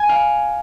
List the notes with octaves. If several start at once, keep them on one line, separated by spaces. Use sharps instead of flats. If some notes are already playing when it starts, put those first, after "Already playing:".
Already playing: G#5
F5